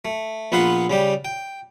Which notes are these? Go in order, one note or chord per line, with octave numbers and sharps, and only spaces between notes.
A3
A#1 B3 F4 B4 F5 F#5
C#3 G3 G4
G5